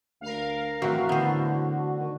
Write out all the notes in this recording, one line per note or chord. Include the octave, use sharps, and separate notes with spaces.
D2 A#4 F5
A2 E3 F#3 C4 F#4
D3 B3 C5
D#3